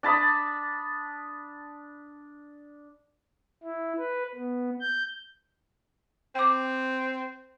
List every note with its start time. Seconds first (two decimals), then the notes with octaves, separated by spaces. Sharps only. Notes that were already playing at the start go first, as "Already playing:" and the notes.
0.03 D4 A5 B5 D#6
3.63 E4
3.98 B4
4.35 B3
4.81 G6
6.35 C4 G5 D6